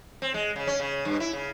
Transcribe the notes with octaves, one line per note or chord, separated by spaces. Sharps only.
C4
G#3
C#3
C#4
C#3
G2
E4
C#3